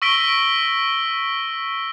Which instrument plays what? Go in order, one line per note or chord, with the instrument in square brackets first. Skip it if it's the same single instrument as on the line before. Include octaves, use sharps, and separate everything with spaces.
[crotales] C#6 E6 A#6 B6 D7 G7